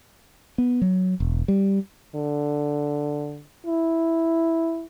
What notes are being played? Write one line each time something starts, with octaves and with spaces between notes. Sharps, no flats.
B3
F#3
E1
G3
D3
E4